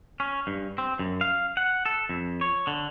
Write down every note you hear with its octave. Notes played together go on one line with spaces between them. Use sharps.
C#4
G2
C4
F#2
F5
F#5
A4
F2
C#5
D3